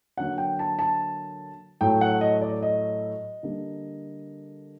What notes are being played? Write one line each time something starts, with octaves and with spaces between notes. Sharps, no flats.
D3 F#3 A#3 F#5
G5
A5
A5
A2 F#3 A3 G5
F#5
D#5
D5
D#5
D3 G3 A#3